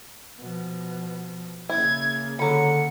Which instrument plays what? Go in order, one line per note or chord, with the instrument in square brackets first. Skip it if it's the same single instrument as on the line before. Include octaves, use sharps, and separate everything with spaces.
[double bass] B2 F3
[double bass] C#3 A#3 [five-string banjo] E4 [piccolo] G#6
[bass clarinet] D3 [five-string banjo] F#3 B5 [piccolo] C#7